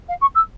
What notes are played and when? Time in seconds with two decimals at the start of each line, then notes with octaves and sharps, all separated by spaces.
0.08 F5
0.21 C#6
0.35 E6